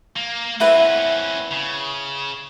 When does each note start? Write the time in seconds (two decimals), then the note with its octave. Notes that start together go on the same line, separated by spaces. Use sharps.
0.16 A#3
0.60 C4 C#4 E4 B4 F#5
1.52 C#3